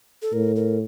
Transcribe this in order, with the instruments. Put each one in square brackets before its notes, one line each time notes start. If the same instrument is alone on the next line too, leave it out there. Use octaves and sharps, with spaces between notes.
[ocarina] A4
[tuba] A2 [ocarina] A#4
[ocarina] A#4